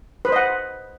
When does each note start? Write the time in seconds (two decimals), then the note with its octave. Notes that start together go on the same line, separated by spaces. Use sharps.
0.25 B4
0.29 C5
0.32 D#5
0.36 F#5